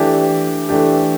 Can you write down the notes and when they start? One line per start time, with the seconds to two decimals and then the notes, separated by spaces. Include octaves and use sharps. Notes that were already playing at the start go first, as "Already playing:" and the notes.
Already playing: E3 A3 D4 G4
0.69 E3 A3 D4 G4